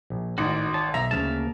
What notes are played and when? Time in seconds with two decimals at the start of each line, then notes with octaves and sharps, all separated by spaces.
0.10 A#1
0.38 G#1 A2 D#4 F#4 A#4 D5
0.74 C#5 D5 A5
0.94 B1 E5 A#5
1.11 D2 C#3 A#3 C#4 F5 A5